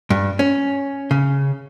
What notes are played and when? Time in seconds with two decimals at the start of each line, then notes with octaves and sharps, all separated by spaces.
0.10 G2
0.39 C#4
1.11 C#3